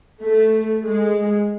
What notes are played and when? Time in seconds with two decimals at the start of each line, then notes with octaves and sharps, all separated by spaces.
0.21 A3
0.84 G#3